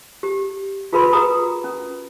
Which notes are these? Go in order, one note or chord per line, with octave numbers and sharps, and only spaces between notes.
G4
F4 G#4 A#4 B4 B5 C6
F#4 G#4 B4 A#5 D#6
C#4